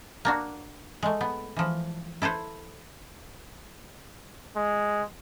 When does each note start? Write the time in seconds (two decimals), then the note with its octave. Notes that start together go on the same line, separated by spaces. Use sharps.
0.25 A#3 D4 F#4
1.03 G#3 A3
1.21 B3
1.56 E3 F3
2.22 E4 A4 B4 C5
4.56 G#3